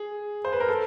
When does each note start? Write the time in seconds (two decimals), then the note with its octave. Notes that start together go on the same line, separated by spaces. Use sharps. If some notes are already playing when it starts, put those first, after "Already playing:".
Already playing: G#4
0.45 C5
0.53 B4
0.60 A#4
0.69 A4